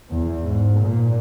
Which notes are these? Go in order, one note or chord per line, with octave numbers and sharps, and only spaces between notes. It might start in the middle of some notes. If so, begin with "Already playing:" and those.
E2
G#2
A#2